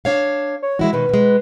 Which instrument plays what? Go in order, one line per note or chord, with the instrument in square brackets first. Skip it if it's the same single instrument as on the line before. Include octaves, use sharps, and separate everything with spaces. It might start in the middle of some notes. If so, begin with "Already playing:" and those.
[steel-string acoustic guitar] D4 C#5 F5
[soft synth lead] C#5
[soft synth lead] E3 [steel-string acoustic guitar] G#3 E4 F#4
[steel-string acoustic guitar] B2 D#3 G#3 [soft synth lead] B4
[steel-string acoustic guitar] B2 G#3